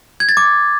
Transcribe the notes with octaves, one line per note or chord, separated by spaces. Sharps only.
G#6
A6
D6